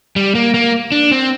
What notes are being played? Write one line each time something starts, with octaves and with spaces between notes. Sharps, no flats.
G3
A#3
A#3
D4
C4